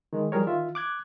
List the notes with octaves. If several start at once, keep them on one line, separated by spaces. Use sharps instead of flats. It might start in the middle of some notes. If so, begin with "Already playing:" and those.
D#3 G#3
F3 G3 G#4 A#4 C#5
D#3 F4 E5
D6 F#6 G#6